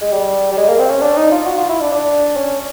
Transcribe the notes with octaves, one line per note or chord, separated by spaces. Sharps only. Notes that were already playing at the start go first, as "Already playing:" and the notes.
G#3
G3
G3
G#3
A#3
C4
C#4
D4
D#4
F4
F#4
F4
E4
D4
D4
C#4